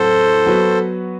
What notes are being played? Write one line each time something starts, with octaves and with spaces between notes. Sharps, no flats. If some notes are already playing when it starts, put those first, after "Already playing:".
Already playing: A2 F#3 C4 F#4 A4 C5
F#3 B3 F#4 B4